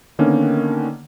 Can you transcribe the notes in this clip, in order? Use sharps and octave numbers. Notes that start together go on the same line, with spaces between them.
D3 D#3 A#3 B3 C#4 D4